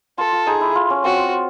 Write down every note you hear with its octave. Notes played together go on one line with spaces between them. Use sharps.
F4 A4
F4
D#4 G#4
E4
F4
C#4
C4 F#4